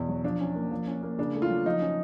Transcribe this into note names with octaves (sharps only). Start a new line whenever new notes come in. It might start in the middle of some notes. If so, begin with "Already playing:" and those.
Already playing: E2 B2
F#3
F3 D4
C#4
A#3
F3
C#4
A#3
C#3 D4
A3
F4
F#3
F3 D#4
C#4